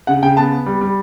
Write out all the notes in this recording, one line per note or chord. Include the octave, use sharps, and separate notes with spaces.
C#3 F#5
C#3 G5
B3 A5
B3
G3
G3